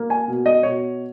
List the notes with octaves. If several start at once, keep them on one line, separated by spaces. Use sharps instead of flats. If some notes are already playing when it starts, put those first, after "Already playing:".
Already playing: A#3
G#5
B2
D#5
B2 C#5